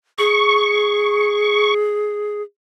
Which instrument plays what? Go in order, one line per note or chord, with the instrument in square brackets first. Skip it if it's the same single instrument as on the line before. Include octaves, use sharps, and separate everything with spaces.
[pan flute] G#4 [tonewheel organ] C#6